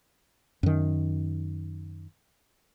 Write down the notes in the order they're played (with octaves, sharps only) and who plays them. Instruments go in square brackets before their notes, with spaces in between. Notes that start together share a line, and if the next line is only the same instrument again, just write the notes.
[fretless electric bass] F#2 D#3